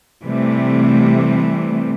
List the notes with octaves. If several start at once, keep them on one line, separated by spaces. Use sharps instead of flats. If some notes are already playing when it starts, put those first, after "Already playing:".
C3 E3 G3 A3